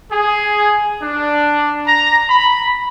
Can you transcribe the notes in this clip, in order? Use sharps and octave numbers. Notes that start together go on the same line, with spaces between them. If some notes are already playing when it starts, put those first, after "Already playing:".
G#4
D4
A#5
B5